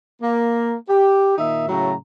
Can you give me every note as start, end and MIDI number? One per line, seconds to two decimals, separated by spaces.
0.22 0.74 58
0.88 1.36 67
1.38 1.66 46
1.38 1.66 51
1.38 1.66 63
1.38 1.66 76
1.67 1.93 45
1.67 1.93 49
1.67 1.93 54
1.67 1.93 57
1.67 1.93 82